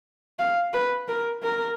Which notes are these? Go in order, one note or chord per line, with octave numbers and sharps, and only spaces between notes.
F5
B4
A#4
A#4